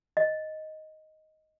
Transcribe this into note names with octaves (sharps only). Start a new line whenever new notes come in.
D#5